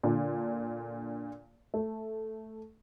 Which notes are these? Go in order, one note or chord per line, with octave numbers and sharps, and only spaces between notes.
A#2 D3
A3